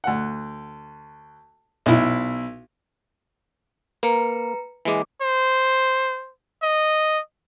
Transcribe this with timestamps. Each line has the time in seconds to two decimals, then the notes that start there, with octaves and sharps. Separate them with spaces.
0.04 D2 F#5
1.86 B1 E4
4.03 A#3 B4 A#5 C#7
4.85 E3 G#3 A#3 D6
5.22 C5
6.63 D#5